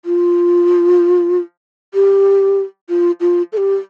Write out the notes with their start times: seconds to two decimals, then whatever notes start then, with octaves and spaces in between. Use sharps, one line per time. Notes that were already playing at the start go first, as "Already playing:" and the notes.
0.05 F4
1.94 G4
2.89 F4
3.20 F4
3.53 A4
3.57 G4